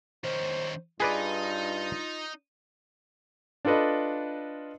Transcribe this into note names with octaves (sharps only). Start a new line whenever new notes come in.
D#3 C#4 C5
G2 D#4 F4 G#4 B4 D5 D#5
D4 F4 A4 B4 D#5